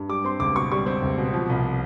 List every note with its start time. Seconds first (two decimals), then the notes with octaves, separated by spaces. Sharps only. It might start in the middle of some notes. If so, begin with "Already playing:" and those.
Already playing: G2
0.09 G3 D6
0.24 C4 C6
0.40 C#2 D6
0.56 B2 C#6
0.72 G3 C#6
0.86 C4
1.03 C#2
1.18 B2
1.33 F3
1.49 C2